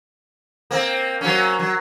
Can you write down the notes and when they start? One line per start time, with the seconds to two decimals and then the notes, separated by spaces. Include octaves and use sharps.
0.71 A#3 C4
1.21 F#3 A#3 C#4
1.59 F#3